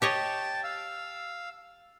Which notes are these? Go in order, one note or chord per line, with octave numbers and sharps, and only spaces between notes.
G4 C#5 D#5 G5 A5
F5 E6